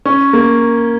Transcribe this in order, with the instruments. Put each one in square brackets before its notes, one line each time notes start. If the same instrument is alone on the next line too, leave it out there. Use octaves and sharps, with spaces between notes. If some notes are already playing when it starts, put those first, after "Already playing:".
[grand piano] C#4
A#3